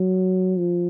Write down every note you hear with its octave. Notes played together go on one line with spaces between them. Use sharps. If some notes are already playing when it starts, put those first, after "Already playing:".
Already playing: F#3
F3